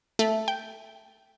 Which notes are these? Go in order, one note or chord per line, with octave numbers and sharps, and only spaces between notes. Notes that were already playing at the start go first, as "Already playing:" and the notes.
A3
G5